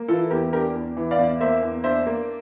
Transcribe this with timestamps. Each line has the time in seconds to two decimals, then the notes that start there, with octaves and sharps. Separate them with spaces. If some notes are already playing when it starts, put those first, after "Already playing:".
Already playing: A#3
0.08 E3 F4 A4
0.30 E2 G4 A#4
0.53 D4 G4 A#4
0.75 E2
0.97 E3
1.11 D5 F5
1.18 E2
1.41 A#3 C5 E5
1.62 E2
1.84 D4 C5 E5
2.07 A#3